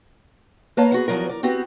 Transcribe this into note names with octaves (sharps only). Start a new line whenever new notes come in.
A#3 B4 C#5 F5 A5 A#5
B3 F#4 G#4
E2 B2 F3 F#3 A#4
A#4 D5
B3 C4 F#4 G4